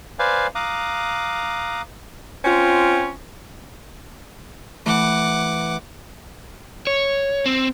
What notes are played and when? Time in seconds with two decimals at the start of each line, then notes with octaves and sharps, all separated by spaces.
0.19 B4 C5 D5 F5 G#5
0.55 F5 A#5 D6 D#6 F#6
2.44 C4 C#4 F4
4.86 E3 A3 F#5 D6
6.87 C#5
7.46 C4